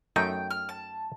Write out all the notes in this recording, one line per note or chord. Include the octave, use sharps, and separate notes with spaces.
F#2 A3 D#4 G5
F6
A5